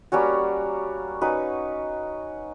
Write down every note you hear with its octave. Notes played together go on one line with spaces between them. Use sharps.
G3 A#3 C#4 F#4
C#4 D#4 F#4 B4